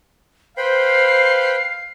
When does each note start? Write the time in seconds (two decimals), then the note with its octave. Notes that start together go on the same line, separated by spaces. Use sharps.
0.57 B4 C5 F5 G5 B5 C7